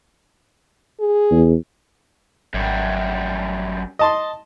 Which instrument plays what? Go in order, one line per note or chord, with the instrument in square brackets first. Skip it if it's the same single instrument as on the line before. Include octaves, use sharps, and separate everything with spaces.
[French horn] G#4
[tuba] E2
[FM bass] G#1 [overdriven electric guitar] F#2 G3
[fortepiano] D#5 A5 C6